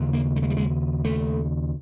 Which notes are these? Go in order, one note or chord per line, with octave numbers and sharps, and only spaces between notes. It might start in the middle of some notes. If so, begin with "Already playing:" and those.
Already playing: D#2 C#3
A#3
A3
G#3
G3
G#3
A3